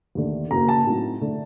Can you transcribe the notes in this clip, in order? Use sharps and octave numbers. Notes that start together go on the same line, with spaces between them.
D#2 D3 A3
F#1 F#2 F#3 A#3 A#5
A5
A2 F#3 C4 D#4
D3 A3